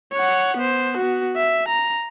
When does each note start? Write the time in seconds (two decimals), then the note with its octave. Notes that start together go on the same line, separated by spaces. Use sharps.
0.13 C#5 F#5
0.57 B3 C5
0.97 B3 F#4
1.37 E5
1.68 A#5